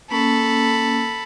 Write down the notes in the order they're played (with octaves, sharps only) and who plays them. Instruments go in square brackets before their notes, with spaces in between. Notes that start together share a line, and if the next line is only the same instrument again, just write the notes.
[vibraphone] A#3 C#4 [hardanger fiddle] A4 B5